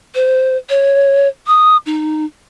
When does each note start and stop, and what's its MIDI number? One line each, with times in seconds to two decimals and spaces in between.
0.15 0.56 72
0.70 1.28 73
1.47 1.77 87
1.86 2.25 63